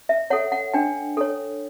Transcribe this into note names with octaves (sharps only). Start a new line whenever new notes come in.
E5
A4 C#5 F#5
F#5
D4 G5
A4 C#5